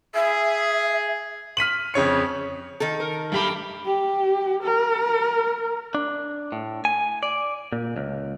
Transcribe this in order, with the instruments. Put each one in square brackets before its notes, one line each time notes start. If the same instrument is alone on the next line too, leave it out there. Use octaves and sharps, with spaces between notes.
[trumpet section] G#4 [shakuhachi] E5
[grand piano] F6 B6 D#7 F#7
F2 C#3 C#5 C#7
[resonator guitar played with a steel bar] D#3 A4
[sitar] A#4
[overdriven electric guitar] G2 B5 [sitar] A3 A#3 G4
[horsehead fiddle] G4
A#4
[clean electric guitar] D4
A2
G#5
D5
A#2
C#2